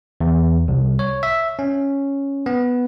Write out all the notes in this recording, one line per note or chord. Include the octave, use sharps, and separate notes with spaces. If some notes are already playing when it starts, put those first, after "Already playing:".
E2
C2
C#5
E5
C#4
B3